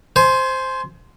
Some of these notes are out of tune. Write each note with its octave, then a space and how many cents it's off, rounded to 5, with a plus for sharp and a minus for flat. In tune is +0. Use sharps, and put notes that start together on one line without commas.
C5 +0 G#5 +35